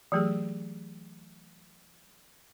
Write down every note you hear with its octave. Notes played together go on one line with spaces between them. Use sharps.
E3 F#3 A3 G4 G#4